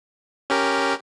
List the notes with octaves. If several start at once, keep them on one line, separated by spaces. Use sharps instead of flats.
C#4 G4 A#4